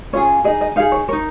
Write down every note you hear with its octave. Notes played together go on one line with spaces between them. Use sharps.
C#4 F4 G#4 C#5
D#4 G#4 D#5
D#5
D#4 G#4 F5
C#5
D#4 A#4 C#5